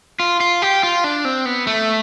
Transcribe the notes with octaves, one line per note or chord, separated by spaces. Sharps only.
F4
F4
G4
F4
D4
C4
B3
A3